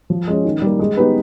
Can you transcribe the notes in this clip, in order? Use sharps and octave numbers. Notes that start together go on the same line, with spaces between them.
F3
G#3 C#4
D#3
G3 A#3
G#3
B3 D#4 G4 B4